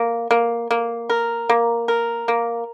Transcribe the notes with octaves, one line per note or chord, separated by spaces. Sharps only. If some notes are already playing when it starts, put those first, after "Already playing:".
Already playing: A#3
A#3
A#3
A#4
A#3
A#4
A#3